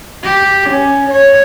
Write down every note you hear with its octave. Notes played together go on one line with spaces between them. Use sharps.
G4
C#4
C#5